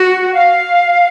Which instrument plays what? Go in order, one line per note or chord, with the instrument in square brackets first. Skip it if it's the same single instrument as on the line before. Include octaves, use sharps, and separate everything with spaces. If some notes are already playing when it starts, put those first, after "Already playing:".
Already playing: [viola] F#4 [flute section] F#5
[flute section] F5